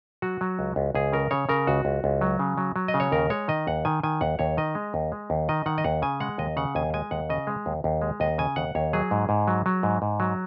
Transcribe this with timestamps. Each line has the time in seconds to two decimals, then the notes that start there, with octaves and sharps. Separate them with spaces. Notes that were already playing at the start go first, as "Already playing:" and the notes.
0.22 F#3 F#4
0.41 F#3
0.59 C#2
0.76 C#2
0.95 C#2 G#4
1.13 C#3 A#4
1.31 C#3 C#5
1.49 C#3 A#4
1.67 C#2 F#4
1.85 C#2
2.04 C#2
2.21 F#3
2.39 C#3
2.58 F#3
2.76 F#3
2.88 D#5
2.94 C#3
3.00 C#5
3.12 D#2 A#4
3.30 G#3 C#5
3.48 D#3 D#5
3.67 D#2 F#5
3.85 D#3 G#5
4.03 D#3 G#5
4.21 D#2 F#5
4.39 D#2 C#5
4.57 D#3 D#5
4.75 G#3
4.94 D#2
5.12 G#3
5.30 D#2
5.49 D#3 D#5
5.66 D#3 F#5
5.78 D#5
5.84 D#2 F#5
6.02 C#3 G#5
6.20 G#3 F#5
6.38 D#2 D#5
6.57 C#3 F#5
6.75 D#2 G#5
6.94 G#3 G#5
7.11 D#2 F#5
7.30 C#3 D#5
7.47 G#3
7.66 D#2
7.84 D#2
8.02 G#3
8.20 D#2 D#5
8.38 C#3 G#5
8.56 D#2 F#5
8.75 D#2 C#5
8.93 F#3 G#4
9.11 G#2
9.29 G#2
9.47 F#3
9.66 F#3
9.83 G#2
10.02 G#2
10.20 F#3